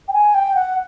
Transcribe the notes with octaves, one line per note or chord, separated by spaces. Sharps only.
G5
G#5
G5
F#5